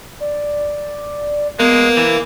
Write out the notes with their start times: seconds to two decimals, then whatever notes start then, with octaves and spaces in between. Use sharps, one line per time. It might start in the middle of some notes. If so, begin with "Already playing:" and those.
0.20 D5
1.60 G#3 A#3 B3
1.97 E3